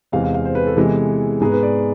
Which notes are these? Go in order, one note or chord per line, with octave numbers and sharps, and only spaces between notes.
E2 C3 G#3 C4 F5
F5
F5
C5
B4
A4
C3 E3 G#3 B3
G#2 G#3 B3 G#4
B4
D5